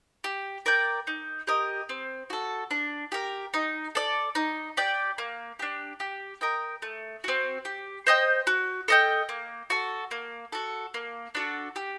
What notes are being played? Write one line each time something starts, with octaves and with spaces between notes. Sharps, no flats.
G4
A#4 D5 G5
D#4
G4 A#4 D#5
C4
F#4 A4
D4
G4 A#4
D#4
A4 D5
D#4
G4 D5 G5
A#3
D4 G4
G4
A#4 D#5 G5
A3
C4 F#4
G4
C5 D#5 G5
F#4
A4 D#5 G5
A#3
F#4 A4
A#3
F#4 A4
A#3
D4 F#4 A4
G4